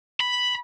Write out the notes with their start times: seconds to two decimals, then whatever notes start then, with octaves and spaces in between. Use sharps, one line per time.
0.20 B5